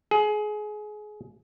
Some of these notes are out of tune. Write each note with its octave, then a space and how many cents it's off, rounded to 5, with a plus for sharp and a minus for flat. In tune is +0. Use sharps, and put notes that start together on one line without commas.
G#4 +25